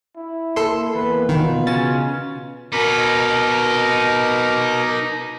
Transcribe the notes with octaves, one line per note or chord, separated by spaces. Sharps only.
E4
A#3 A4 C6
E2 A#3 B4
B2 D#3 F4
C#3 C#4 A6
B2 D#4 A#4 B4 D6